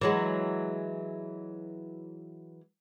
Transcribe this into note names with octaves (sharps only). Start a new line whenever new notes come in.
E3 F#3 G#3